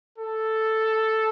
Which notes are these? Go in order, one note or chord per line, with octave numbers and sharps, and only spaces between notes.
A4